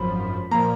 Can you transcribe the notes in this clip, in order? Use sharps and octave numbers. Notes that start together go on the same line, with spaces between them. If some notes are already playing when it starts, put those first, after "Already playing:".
Already playing: G#1 F#2 F3 B5
A#2 F3 A#3 A#5